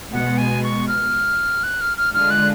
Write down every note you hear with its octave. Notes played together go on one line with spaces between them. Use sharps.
B2 G#3 B3 F#5
G#5
C#6
F6
F#6
F6
F6
D3 G#3 D4 F4 F6
F#6